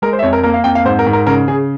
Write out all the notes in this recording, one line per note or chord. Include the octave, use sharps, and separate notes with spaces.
G#3 A#4
C5
E5
F2 C#5
A#4
A#3 A#4
F5
F2 G5
F5
G#2 C5
A#4
G#2
A#4
C#3 A#4
C#3 G#4